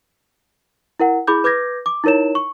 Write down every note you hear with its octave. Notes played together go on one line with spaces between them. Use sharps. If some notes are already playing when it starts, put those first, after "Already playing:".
E4 A#4 F#5
E4 G#4 B5 D6 G6
B4 D6 G6 G#6 A#6
D6
D#4 E4 A#4 C#5 E7
C#6